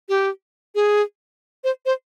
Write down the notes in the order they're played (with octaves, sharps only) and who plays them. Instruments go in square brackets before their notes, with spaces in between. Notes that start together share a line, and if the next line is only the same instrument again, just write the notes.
[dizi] G4
G#4
C5
C5